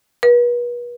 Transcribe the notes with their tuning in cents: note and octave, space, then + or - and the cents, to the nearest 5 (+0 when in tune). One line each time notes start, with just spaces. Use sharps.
B4 -40